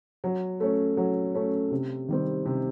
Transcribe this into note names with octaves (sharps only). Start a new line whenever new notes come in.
F#3
A3 C#4
F#3
A3 C#4
C3
D#3 G3 C4
C3